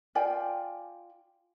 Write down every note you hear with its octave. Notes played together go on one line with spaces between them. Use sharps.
F4 D5 G5 G#5